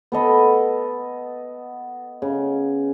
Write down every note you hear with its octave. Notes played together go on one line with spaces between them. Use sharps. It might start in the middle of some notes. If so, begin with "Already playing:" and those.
B3 A4 D#5 B5
C#3